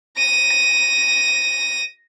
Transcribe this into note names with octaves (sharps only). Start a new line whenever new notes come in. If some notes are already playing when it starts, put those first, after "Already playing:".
A#6 D#7